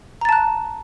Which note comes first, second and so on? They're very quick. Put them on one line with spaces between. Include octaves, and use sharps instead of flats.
A#5 A6 A5 F#6